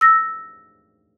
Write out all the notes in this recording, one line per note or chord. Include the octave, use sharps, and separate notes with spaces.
E6 A#6